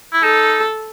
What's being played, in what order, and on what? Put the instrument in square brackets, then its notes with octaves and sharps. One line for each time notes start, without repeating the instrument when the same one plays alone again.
[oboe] E4
[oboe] D#4 [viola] A4